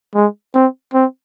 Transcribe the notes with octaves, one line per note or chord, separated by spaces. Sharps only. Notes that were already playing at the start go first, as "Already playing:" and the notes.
G#3
C4
C4